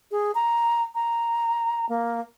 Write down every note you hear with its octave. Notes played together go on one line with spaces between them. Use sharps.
G#4
A#5
A#5
A#3